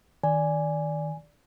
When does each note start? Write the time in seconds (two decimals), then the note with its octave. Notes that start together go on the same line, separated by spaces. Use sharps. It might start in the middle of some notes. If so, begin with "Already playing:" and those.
0.23 D#3 D5 G#5